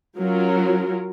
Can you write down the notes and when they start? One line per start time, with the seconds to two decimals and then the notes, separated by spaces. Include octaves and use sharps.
0.18 F#3 C#4 F4 F#4 A#4